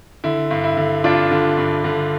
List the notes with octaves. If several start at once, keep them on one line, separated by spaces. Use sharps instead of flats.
D3 E4
G2
E4
D3
G2 D4 F4
D3
G2
D3